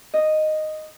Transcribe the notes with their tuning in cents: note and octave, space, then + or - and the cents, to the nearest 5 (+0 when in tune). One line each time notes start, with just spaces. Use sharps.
D#5 -5